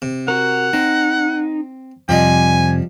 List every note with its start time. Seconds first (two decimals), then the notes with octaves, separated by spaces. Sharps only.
0.02 C3
0.28 F#4 A#4 F#5
0.73 C4 D#4
2.09 F2 C3 F3 G3 D#5 G#5